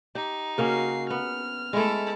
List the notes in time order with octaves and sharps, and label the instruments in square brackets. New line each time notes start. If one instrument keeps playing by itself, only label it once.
[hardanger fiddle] D#4 [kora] G4
[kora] C#3 A#3 C#4 [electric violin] F#4 C7
[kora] B3 [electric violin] F6
[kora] G#3 A3 [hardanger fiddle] E4 A4